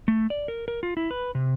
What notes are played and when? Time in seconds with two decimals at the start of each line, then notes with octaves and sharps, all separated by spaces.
0.08 A3
0.30 D5
0.48 A#4
0.68 A#4
0.83 F4
0.97 E4
1.11 B4
1.35 C3